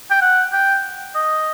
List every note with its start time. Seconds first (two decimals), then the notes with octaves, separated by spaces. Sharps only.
0.11 G5
0.21 F#5
0.53 G5
1.15 D#5